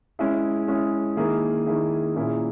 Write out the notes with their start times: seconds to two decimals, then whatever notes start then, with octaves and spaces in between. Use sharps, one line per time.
0.19 G#3 C#4 E4 G#4
0.68 G#3 C#4 E4 G#4
1.17 D#3 A#3 E4 G#4
1.66 D#3 A#3 E4 G#4
2.16 A#2 A#3 C#4 E4 G#4